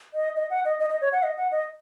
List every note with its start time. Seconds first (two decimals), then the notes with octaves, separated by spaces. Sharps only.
0.14 D#5
0.36 D#5
0.50 F#5
0.65 D#5
0.79 D#5
0.90 D#5
1.01 C#5
1.13 F#5
1.23 D#5
1.37 F#5
1.52 D#5